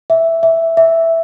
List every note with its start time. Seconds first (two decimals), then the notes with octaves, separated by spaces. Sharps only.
0.10 E5
0.43 E5
0.77 E5